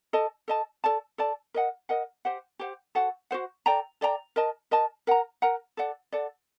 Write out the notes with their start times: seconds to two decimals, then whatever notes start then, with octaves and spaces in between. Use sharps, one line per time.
0.13 A4 D#5 A5
0.48 A4 D#5 A5
0.84 A4 D5 A5
1.18 A4 D5 A5
1.54 A#4 D#5 F#5
1.89 A#4 D#5 F#5
2.25 G4 C5 F#5
2.59 G4 C5 F#5
2.95 F#4 A4 C5 F#5
3.31 F#4 A4 C5 F#5
3.66 A4 D5 G5 A#5
4.01 A4 D5 G5 A#5
4.36 A#4 D#5 A5
4.71 A#4 D#5 A5
5.07 A#4 F#5 A#5
5.42 A#4 F#5 A#5
5.77 A4 D5 F#5
6.12 A4 D5 F#5